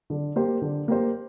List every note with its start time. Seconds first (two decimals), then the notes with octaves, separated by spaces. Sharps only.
0.10 D3
0.36 A#3 G4 C5
0.62 D3
0.88 A#3 G4 C5